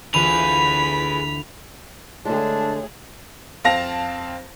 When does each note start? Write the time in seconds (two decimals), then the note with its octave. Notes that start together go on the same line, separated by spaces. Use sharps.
0.14 D2 E3 F4 G#4 B4 B5 B6 F7
2.25 D3 G#3 A3 D4 G#4 C#5
3.64 F2 C4 F5 A5 A#6 F7